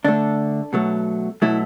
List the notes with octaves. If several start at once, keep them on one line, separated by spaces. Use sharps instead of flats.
D3 A3 D4
B2 F#3 A3
B2 F#3 A3 E4